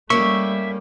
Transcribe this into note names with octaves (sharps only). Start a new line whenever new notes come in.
G3 A3 A#3 C#4 E5 C#6